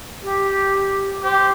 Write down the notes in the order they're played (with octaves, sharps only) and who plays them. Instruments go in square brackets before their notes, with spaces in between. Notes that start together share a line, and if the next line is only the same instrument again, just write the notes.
[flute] G4
[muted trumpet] G4 [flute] C5